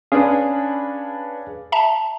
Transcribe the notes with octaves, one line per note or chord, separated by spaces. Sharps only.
C#4 D4 G#4 B4 F5
E5 A5 A#5